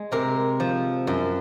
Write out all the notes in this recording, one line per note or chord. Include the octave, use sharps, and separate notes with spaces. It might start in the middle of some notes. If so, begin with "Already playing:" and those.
Already playing: G#3
C3 A#4
F3
F#2